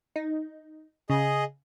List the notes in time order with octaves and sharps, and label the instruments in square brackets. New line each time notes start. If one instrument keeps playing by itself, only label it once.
[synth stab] D#4
[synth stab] C#3 [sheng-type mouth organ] G#4 D#5